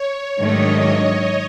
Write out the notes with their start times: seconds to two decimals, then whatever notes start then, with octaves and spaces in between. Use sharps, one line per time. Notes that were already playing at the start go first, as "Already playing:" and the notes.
Already playing: C#5
0.39 G#2 D#3 F#3 A3 D4 D#5